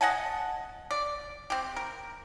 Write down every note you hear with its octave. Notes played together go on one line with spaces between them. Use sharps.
D#5 F#5 G#5 A5
D5
C4 G4
A#4